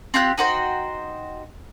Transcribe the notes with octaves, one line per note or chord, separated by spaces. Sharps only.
C4 F4 G4 F#6
D#4 F#4 C5 G5